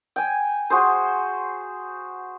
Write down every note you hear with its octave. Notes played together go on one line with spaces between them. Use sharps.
G5 G#5
F#4 G#4 C5